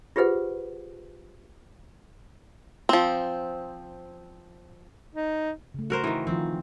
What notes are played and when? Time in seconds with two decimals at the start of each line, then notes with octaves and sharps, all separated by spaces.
0.16 F4 G4 G#4 B4 C5 F#5
2.89 F3 C4
5.16 D#4
5.74 C#3 A3
5.90 F#4 A#4 C5
6.04 D#3 E3
6.27 D#3 F3 C4 F4